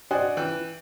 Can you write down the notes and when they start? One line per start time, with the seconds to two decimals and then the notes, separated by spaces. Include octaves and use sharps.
0.11 D4 F#4 C5 D#5 F#5 G#5
0.37 E3 G5 F#6